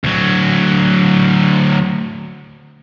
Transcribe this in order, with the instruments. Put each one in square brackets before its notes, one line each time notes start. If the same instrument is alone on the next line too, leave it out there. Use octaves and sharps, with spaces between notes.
[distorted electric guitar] D2 F#3